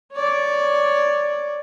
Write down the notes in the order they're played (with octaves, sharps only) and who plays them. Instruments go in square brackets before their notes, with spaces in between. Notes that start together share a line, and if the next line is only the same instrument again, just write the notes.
[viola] C#5 D5